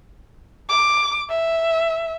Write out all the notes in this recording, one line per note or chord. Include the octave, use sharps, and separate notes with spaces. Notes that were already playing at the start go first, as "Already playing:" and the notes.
D6
E5